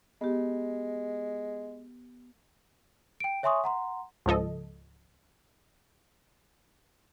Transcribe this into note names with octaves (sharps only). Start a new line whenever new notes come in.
G#3 B3 G4
G5 D7
C#5 E5 G#5 C6 C#6 D#6
F#5 A#5 C6
C#2 G#2 F3 A4 D#5